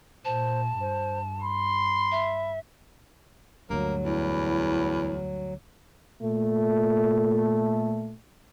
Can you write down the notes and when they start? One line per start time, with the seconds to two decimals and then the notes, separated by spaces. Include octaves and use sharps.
0.25 A#2 C5 A5
0.81 G2 C5
1.41 B5 C6
2.12 E5
3.70 D2 G2 F#3 A#3
4.05 E2 E4
6.22 A#2 A3